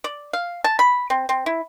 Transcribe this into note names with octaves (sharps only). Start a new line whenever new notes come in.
D5
F5
A5
B5
C4
C4
E4